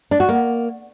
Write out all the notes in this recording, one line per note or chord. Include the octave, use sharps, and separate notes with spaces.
D4
F#4
A#3